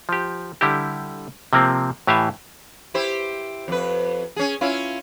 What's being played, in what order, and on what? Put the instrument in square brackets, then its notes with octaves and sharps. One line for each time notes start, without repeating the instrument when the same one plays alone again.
[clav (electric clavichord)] F3 G4
D3 G3 E4 G4
C3 F3 A#3 C4
A2 E3 G4 F5 G#5 A5
[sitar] E4 G4 C5
F2 B4
C#4 G#4
C#4 E4 F4